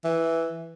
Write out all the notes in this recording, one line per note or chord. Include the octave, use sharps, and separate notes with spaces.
E3